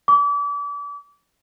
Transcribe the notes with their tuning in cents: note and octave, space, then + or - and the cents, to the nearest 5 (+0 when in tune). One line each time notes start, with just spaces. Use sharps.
D6 -35